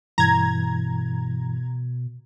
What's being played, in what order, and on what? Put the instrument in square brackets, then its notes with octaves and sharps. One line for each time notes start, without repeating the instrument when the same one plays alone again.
[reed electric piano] G2 E3 [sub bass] B2 [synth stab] A#5 G#6